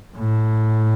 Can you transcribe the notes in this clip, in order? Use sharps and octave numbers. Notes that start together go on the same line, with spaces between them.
A2